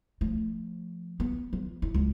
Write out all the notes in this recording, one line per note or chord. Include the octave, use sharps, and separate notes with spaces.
F3 A3
B3
F3
E4
C#2